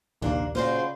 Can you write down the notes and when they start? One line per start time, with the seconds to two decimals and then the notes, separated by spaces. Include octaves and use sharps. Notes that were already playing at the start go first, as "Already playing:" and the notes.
0.22 A#1 D#2 C3 A#3 D4 C5
0.55 A#2 C#3 F4 F#4 C5 D5